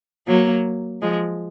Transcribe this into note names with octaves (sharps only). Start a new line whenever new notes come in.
F#3 A#3
F3 G#3